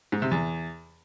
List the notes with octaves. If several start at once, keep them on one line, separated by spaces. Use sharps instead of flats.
G#2
C3
E2